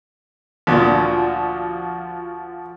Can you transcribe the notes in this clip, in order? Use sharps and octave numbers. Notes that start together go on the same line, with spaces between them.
D2 A#2 F3 F#4 A6